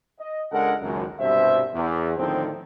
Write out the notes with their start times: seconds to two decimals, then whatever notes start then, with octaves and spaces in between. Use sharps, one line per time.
0.19 D#5
0.52 C#2 G#3 D4 A4 A#4 F#5
0.82 G#1 C#2 F#2
1.20 C2 G2 B2 C5 E5
1.74 E2
2.17 A2 D3 D#3 F3 C4